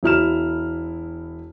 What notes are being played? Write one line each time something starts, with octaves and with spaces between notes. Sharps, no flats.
E1 E4 F6 E7